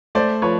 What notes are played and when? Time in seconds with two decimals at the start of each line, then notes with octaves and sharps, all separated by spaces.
0.15 A3 C5 D5
0.42 F3 B4 C#5